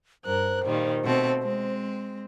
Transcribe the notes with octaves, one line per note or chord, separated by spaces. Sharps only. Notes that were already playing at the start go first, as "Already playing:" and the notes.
G2 A#4 C5 F#6
A#2 D#3 G3
B2 A3 C4
G#3 C4